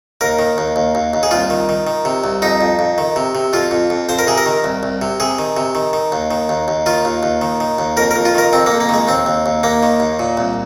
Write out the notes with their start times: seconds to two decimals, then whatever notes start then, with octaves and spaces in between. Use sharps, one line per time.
0.21 D#2 A#4
0.39 D#3
0.58 D#2
0.76 D#2
0.95 D#2
1.14 D#2
1.23 G#4
1.31 C2 F4
1.50 D#3
1.69 D#3
1.87 D#3
2.05 C3
2.24 C2
2.42 F2 D#4
2.61 F2
2.79 F2
2.98 D#3
3.16 C3
3.35 C3
3.53 F2 F4
3.71 F2
3.90 F2
4.09 F2 C5
4.19 A#4
4.27 C3 G#4
4.38 A#4
4.46 D#3
4.64 C2
4.83 C2
5.02 C3
5.20 C3 G#4
5.39 D#3
5.57 C3
5.75 D#3
5.93 D#3
6.12 D#2
6.31 D#3
6.49 D#2
6.68 D#2
6.86 D#3 F4
7.05 D#2
7.23 D#2
7.42 D#3
7.60 D#3
7.79 D#2
7.97 F2 A#4
8.11 F2 A#4
8.25 F4
8.35 D#3 A#4
8.53 F2 C4
8.66 A#3
8.72 F2
8.80 A#3
8.89 D#3 G#3
9.08 D#2 C4
9.26 D#2
9.46 D#2
9.63 D#2 A#3
9.83 D#3
10.00 D#2
10.19 A#2
10.37 C2